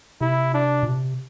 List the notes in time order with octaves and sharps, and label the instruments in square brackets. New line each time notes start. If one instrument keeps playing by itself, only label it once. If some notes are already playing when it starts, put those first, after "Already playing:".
[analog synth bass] C3 [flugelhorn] E4
[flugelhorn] D4
[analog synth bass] A#2
C3